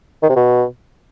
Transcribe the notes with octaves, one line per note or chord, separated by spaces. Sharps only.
D#3
C3
B2